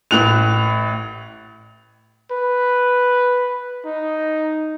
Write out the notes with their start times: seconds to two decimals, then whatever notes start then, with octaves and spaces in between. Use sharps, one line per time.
0.11 A1 A2 F#6 F7
2.32 B4
3.86 D#4